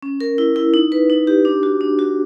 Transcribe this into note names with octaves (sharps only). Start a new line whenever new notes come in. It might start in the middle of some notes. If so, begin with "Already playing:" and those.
C#4
A#4
E4
E4
D#4
B4
D#4
G4
D4
F#4
D4
F#4